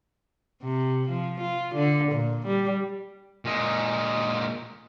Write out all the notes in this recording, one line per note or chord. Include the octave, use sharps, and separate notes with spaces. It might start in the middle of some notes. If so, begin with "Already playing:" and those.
C3
F3
F4
D3
A#2
G3
A#2 G#3